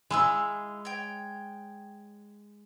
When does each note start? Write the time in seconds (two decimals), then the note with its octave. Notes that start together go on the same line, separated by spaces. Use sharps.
0.11 G#3 E4 F4 E6
0.85 C#5 G5